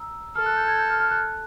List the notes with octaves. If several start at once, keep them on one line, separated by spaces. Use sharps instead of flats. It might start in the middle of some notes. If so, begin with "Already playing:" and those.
Already playing: A#5 D#6 E6
A4 F6
F#6
G6
G#6
G6
F6
F6
F#6